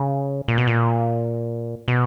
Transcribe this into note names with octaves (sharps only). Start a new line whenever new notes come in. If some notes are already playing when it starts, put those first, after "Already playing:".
Already playing: C#3
A#2
B2
A#2
B2